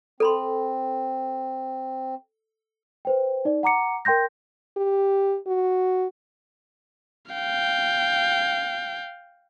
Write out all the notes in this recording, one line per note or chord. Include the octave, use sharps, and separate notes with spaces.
C4 A4 B5 C6
B4 C5 G5
D#4 D5
F#5 A#5 D6 C#7
A#4 G5 C6 G6 A#6
G4
F#4
F5 G5